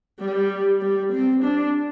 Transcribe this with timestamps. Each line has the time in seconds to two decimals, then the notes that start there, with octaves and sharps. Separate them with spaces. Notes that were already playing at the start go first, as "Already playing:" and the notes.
0.20 G3
0.81 G3
1.12 C4
1.43 D4